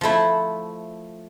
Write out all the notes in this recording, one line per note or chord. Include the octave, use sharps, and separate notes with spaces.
F3 A3 E4